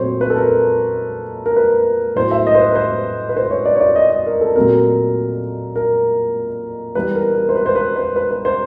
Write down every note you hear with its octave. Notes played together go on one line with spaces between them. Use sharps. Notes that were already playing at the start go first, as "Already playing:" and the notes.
Already playing: A#2 F#3 A3 C4 C5 C#5
B4
A4
A#4
A#4
B4
A2 F#3 B3 C5
E5
D#5
C5
B4
B4
C5
B4
C5
C#5
D5
C#5
D5
D#5
D#5
A#4
A4
A#2 F#3 A3 C4 A#4
A#4
E3 G3 B3 B4
A#4
A#4
C5
B4
C5
B4
C5
B4
B4
C5